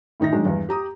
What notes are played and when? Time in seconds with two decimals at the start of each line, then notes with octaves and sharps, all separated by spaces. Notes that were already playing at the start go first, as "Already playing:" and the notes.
0.20 A2 D#3 D#4 E4 A#6
0.33 D#3 F#3 G#3 D4
0.45 E2 G2
0.69 G4 A#5 D#6